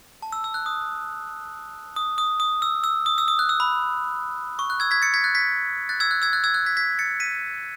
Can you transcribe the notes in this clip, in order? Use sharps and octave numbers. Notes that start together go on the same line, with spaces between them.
A5
E6
E6
F#6
D#6
D#6
D#6
D#6
E6
E6
D#6
E6
D#6
F#6
E6
B5
C#6
F#6
E6 G#6
G#6 B6
A6 C#7
G#6 B6
F#6 A6
G#6 B6
F#6 A6
E6 G#6
F#6
E6 G#6
F#6 A6
E6 G#6
F#6
G#6 B6
G#6 B6
A6 C#7
B6 D#7